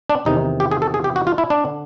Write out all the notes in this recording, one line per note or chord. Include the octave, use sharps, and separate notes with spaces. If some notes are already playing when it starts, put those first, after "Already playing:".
D4
E2 C3 D#3 D#4
G4
G#4
A4
G#4
G4
F#4
F4
E4
D4
D3